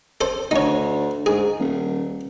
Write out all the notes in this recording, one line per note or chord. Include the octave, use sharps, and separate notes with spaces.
A4 C5
D2 D#4 C#5
G#2 G#4
D#1